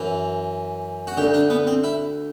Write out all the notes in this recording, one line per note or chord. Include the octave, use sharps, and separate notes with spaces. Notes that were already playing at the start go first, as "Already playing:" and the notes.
Already playing: F#2 E3
F#4
D2 D3 G4
D4
B3
C4
E4